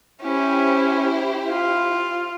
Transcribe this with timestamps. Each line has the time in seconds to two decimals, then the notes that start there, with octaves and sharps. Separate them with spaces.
0.23 C#4 E4 G4 C5
1.49 F4